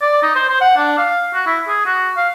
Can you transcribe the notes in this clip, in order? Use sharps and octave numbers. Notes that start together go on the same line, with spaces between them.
D5
D#4
C5
C5
F#5
D4
F5
F#4
E4
G#4
F#4
F5